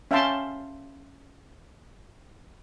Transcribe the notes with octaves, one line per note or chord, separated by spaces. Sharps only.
C#4 E5 F5 G5 A5 C6